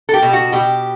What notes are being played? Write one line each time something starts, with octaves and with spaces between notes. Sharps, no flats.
A4
G4
B2
F#4
B2 G4